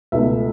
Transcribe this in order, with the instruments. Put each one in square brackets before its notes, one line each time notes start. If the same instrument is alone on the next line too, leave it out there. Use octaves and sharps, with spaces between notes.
[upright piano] C#2 B2 A3 E5